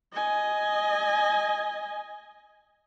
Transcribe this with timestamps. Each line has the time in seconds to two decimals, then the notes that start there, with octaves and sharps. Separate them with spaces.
0.12 D#5 G#5